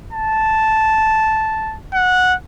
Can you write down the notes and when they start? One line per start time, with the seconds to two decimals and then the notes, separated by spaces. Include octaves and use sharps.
0.13 A5
1.94 F#5